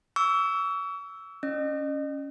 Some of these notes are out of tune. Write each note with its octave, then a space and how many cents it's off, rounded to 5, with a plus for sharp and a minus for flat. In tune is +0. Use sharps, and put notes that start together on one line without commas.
C#6 +45 E6 +0
C#4 +0 D#5 -35